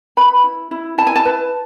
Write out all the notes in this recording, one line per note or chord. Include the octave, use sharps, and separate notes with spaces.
B4 B5
E4
E4
E4 A5
G#5
A5
B4